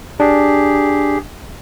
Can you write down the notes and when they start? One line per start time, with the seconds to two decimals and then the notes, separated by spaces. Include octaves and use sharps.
0.20 D4 G4 G#4